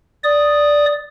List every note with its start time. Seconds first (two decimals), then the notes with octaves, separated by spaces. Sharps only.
0.24 D5 D#6